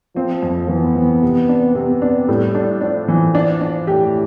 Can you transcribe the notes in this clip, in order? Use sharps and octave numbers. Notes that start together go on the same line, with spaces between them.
F3 C4
F2
E3 B3
E3
C3
D4
C3 B3
D4
A2 G3
D4
F3 D4
E3
D4
D4
A2 G4